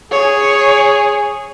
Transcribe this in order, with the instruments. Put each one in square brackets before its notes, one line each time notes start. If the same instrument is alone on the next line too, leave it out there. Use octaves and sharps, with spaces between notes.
[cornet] G#4 [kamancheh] C#5